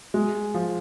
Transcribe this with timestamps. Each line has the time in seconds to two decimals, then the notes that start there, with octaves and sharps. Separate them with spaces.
0.14 G#3
0.54 F3